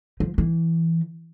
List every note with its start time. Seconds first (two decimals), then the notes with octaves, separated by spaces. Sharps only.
0.20 F3
0.38 E3